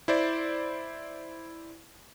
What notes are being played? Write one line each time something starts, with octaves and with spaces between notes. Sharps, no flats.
E4 C5 D5